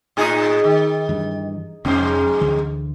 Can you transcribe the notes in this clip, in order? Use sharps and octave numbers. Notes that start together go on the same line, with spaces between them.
A2 D#4 G#4
D#3
G2 E3
F1 F2 G#2 C#4 C5
D2 E3